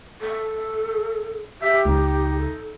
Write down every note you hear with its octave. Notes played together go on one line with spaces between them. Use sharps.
A4
G4 E5
C#2 D#4
A4